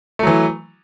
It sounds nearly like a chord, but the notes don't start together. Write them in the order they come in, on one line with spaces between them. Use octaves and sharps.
A3 F#3 E3